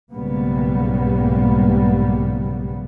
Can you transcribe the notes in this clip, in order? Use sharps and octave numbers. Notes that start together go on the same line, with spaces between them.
B1 G#2 C#3 G3 A#3 B3